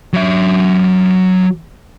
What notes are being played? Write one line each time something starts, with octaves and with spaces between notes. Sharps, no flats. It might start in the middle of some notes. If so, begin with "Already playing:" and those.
F#3 E5